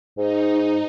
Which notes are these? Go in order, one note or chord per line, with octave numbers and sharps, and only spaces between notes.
G#2 D#4